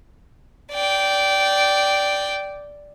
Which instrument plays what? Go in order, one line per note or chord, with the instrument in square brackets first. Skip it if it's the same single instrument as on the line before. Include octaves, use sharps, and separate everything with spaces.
[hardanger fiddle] D5 G5